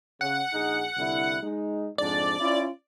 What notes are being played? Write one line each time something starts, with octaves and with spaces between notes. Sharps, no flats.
C#3 F#5
A#1 D#4 G#4
C2 D3 E4
G#3 D#4
F2 G#2 D4 D5
C#4 E4 F4